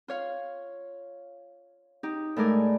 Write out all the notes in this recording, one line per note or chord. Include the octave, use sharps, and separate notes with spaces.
F4 C#5 F5
D#4 G4
A2 G#3 A3 A#4 D5 G#5